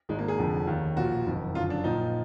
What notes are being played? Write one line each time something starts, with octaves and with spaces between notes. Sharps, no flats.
G#1 G#2 D#3 G#3
A#3
G#4
F1 F2 D3 F3
D#2 D#3
B1 A#2 F3 F#4
F#1 F2 D#3
F#1 F#2 D3 F3 F4
D4
A#1 A#2 F3 D#4